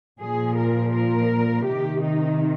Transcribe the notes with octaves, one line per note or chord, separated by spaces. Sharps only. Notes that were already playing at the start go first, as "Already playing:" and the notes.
A#2 F3 G#4
A#4
A#4
C3 D#3 G4
D#4